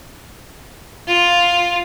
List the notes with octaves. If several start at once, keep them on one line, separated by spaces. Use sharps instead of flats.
F4